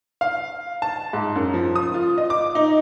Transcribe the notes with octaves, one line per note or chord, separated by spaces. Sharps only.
F5
A5
G#2
F#2
F3
D#6
F4
D#5
D6
D#4